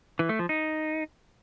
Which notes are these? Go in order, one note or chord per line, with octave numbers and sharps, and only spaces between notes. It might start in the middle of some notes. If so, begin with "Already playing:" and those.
E3
A3
F3
D#4